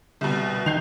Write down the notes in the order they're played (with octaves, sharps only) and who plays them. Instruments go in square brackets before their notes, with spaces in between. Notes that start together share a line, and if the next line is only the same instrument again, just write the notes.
[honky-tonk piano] C2 B2
[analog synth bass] D#3 [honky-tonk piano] G6 C7 F7